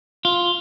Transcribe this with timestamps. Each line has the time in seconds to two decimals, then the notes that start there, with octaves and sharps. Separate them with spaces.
0.25 F4